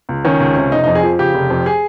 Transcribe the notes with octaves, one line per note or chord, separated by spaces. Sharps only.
C#2
D#3 C#4
C#2
C3
F1 D#4
F2 D#4
G#4
F3
C#3 G4
F1
F2
G#4